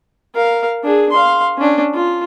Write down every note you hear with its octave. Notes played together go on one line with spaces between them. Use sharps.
A#4 F5
D4 G#4
F5 C6
C#4 D4
F4